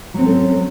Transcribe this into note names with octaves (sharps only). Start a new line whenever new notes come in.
F#3 C4 C#4 A4